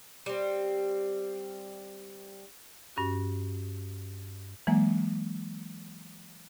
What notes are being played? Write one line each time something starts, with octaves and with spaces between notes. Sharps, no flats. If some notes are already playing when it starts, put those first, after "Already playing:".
G3 C4
G2 C#4 F#4
E3 F#3 G#3 A#3